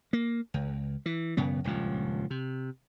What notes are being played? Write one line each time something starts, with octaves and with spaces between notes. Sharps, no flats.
A#3
C#2
E3
E1 F#2 C#3 B3
D#1 C#2 G2 F3
C3